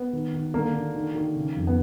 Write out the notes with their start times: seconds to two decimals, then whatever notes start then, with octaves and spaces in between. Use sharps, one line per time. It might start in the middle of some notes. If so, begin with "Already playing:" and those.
Already playing: B3
0.13 D#3
0.34 D#3
0.54 D3 A#3
0.74 D3
0.95 D#3
1.15 D#3
1.35 C#3
1.56 F2
1.67 B3